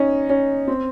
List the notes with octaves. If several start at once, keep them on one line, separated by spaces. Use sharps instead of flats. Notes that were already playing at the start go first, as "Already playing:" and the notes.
Already playing: C#4 D#4
C#4
C4